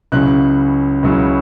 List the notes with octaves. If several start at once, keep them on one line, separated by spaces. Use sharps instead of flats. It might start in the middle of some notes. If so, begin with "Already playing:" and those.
C#2 C#3 F#3 C#4 E4 F#6
C#2 C#3 F#3 C#4 E4